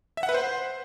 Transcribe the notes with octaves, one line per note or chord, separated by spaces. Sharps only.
E5
F#5
B4
C5